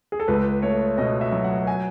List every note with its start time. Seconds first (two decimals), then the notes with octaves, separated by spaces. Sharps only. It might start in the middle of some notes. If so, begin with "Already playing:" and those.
0.12 G#4
0.20 A4
0.28 C#2 B4
0.62 A3 C#5
0.98 B2 D#5
1.21 E5
1.32 F#3
1.44 F#5
1.67 G#5